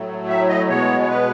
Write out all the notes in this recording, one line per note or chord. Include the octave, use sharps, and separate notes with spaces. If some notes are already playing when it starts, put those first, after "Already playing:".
Already playing: A2 F#3 A3
E5
D#5
B2 G#3 B3 C#5
C#5
B4